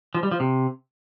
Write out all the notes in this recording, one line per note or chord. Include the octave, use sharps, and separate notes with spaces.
F3
G3
F3
C3